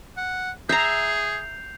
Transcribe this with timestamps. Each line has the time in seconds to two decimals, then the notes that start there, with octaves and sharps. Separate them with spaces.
0.17 F#5
0.69 G#4 E5 A#5 G6 C7 F7